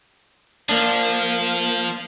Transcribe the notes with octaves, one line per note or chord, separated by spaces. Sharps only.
F3 A#3 D4